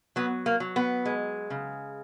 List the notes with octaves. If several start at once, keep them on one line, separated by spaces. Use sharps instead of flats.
F#3 B3
A#3
F#3
B3
G#3
C#3